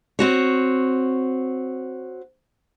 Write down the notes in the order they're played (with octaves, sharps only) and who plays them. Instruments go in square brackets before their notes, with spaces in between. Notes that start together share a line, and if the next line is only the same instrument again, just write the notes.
[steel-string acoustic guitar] C4 F#4 C#5